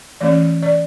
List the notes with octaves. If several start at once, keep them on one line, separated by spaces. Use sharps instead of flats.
E3 A3 C#4 D5
D5